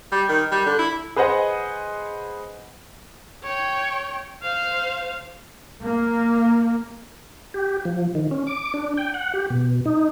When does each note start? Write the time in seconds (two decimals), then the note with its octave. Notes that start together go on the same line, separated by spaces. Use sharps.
0.12 G3
0.29 D#3
0.52 G3
0.66 D3
0.79 E4
1.16 G#4 B4 C5 D#5 F#5
3.44 C#5 G5
4.42 C5 F5
5.82 A#3
7.54 G4
7.85 F3
8.15 D#3
8.31 C#4
8.47 D6
8.74 D4
8.97 G5
9.14 F#5
9.34 G4
9.50 B2
9.86 D#4